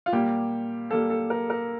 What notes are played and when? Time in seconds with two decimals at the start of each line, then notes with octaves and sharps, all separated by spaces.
0.06 F4
0.12 A#2 G3 A#3 G4
0.91 A#2 G3 A#3 A4
1.10 A4
1.30 A#4
1.50 A#4